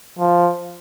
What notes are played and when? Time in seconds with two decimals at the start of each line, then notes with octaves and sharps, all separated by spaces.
0.19 F3